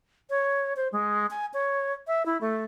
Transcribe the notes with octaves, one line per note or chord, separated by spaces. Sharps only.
C#5
C5
G#3
G#5
C#5
E5
E4
A3